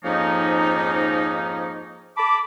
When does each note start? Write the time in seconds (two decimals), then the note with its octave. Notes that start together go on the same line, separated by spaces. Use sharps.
0.04 F2 G#2 F3 A#3 C#4 D#4
2.17 A5 B5 D6